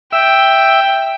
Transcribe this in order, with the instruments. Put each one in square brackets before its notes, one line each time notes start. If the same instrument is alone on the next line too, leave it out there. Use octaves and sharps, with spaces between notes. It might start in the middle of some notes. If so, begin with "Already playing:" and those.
[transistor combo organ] E5 E6 [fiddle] G5